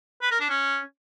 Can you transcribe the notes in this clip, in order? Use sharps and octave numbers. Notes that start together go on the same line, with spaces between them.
B4
A#4
D4
C#4